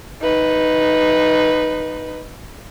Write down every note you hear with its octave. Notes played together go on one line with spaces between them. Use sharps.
D#4 B4